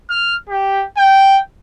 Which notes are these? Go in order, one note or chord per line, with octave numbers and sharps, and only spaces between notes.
F6
G4
G5